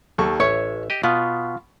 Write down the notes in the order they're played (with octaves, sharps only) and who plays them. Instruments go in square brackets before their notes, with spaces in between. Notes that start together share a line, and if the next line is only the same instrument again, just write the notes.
[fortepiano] D#2 A4 C#6
[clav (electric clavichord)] A1 [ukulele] C#5 [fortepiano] E5
[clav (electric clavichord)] G4 D#5
[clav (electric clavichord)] B2 B3 [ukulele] F4